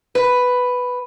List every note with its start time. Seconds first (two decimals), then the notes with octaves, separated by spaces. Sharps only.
0.15 B4